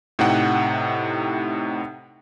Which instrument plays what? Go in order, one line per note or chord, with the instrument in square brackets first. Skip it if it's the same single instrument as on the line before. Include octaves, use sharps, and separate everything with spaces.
[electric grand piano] A2 C3 D#4 F#5 G5